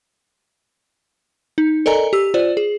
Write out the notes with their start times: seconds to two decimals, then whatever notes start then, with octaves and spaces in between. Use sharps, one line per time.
1.58 D#4
1.86 A4 A#4 D5 D#5 G#5 A#5
2.13 G4 E6
2.34 F4 C5 D5
2.57 G#4